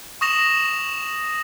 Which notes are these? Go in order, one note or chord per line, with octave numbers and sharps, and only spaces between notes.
C#6 D#6 A#6 E7 F7